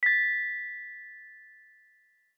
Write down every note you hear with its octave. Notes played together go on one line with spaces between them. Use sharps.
A6 B6